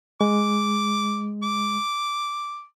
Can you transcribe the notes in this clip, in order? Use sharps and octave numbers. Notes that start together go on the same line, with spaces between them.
G#3 D6
D6